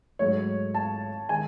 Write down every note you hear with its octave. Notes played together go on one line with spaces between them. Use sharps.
G#2 F#3 A3 C#5
A5
D#3 G#3 G#5